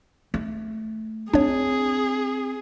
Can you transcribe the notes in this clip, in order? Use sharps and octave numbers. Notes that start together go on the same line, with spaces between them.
A3
C4 D4 G#4 C#5